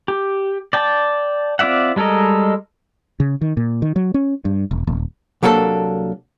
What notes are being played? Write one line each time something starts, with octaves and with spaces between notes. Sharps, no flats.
G4
D5 G5 A5
C4 F4 D5 E5 F#5
G3 G#3 A4 A#4 D#5
C#3
D#3
A#2
D#3
F#3
C#4
G2
E1
D#1
C2 F#3 A#3 D4 A4